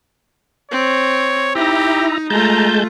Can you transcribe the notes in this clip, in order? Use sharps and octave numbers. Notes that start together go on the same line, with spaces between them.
C4 C#5
D#4 E4 G4 A#5
G#3 A3 F4 A5 A#5 G6